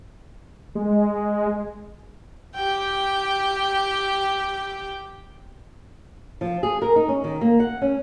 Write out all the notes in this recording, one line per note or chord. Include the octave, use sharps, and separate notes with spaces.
G#3
G4 G5
F3
G#4
A#4
D#4
C#4
D#3
A#3
F#5
C#4